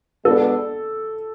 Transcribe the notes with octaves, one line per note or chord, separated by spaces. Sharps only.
B2 G#3 B3 D4 A4